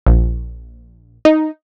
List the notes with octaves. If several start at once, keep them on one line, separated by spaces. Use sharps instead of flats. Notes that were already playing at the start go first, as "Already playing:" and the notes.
A#1
D#4